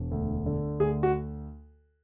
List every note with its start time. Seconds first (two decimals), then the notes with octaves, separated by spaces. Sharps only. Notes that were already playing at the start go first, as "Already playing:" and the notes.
Already playing: E1
0.11 D2
0.46 D3
0.80 D2 G#4
1.03 F#4